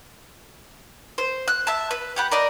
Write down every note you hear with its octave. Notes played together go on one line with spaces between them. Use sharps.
C5
F#6
E5 A5
B4
G4 F#5 B5
A#4 D5 D#5